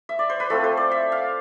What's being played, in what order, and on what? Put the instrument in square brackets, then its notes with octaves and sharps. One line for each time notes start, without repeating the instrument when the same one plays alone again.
[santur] E5
D5
C5
B4
A3 C4 F4 A4
C5
D5
E5
F5